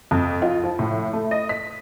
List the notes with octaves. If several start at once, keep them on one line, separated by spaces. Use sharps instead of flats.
F2
F4
F3
A2
A3
D#5
B6